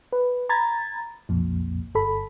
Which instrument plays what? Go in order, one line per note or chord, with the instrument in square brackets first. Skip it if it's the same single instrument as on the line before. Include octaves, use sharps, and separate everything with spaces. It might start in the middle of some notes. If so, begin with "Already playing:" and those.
[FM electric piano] B4
A#5 B5 G#6 A6
B1 F2 A#2
G1 A4 B5